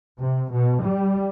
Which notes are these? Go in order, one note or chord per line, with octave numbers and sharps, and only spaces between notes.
C3
B2
G3